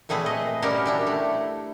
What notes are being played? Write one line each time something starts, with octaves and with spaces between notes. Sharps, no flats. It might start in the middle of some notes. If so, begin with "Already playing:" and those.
A#2 A3 C4 G#4 B4
D#5
G3 C#4 F#4 G4 A#4
D4 E4 G4
A3